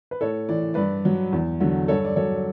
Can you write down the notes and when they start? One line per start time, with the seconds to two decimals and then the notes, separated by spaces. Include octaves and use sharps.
0.11 B4
0.21 A2 A4 C#5
0.49 E3 D5
0.74 G2 B4 D5
1.05 F#3
1.33 E2
1.60 D3 F#3
1.88 G2 A4 C#5
2.05 D5
2.16 F#3 A4 C#5